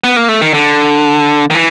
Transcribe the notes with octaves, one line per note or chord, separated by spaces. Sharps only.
B3
A#3
A3
D#3
D3
D#3
E3